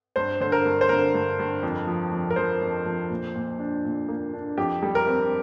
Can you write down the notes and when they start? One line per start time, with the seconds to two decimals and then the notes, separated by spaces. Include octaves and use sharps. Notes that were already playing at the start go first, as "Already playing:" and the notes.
0.16 G2 C5
0.41 D3 C5
0.52 A#4
0.65 G2
0.81 C5
0.89 D3 A#4
1.14 G2
1.39 G2
1.63 F2
1.87 F3
2.12 F2
2.30 A#4
2.36 F3 C5
2.62 F2
2.86 F2
3.10 A#2
3.35 A#2
3.59 D4
3.85 A#2
4.08 A#3
4.33 D4
4.58 F2 G4
4.83 G3
4.95 A#4
5.07 C4